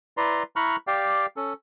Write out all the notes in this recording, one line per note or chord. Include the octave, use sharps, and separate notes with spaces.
E4 B4 D5 A#5 C6
E4 A#5 B5 C#6 F6 F#6
G4 D5 F5 G5
C#4 A4